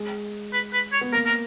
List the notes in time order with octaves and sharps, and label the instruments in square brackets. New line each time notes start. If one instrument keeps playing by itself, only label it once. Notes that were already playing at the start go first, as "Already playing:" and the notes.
Already playing: [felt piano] G#3
[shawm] B4
B4
C#5
[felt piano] B3
[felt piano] A#3 [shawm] A#4
[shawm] A#4